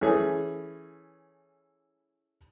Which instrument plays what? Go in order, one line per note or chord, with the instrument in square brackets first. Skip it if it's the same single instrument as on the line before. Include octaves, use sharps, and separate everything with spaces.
[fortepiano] E3 A3 C#4 G#4